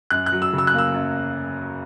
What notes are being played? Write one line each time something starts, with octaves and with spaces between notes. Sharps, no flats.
F#2 F#6
F#6
F#3
E6
C#3
E6
F#6
A#3
E6
F#2